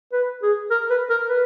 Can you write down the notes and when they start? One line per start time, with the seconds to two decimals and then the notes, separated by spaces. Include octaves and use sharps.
0.13 B4
0.42 G#4
0.71 A#4
0.90 B4
1.10 A#4
1.29 B4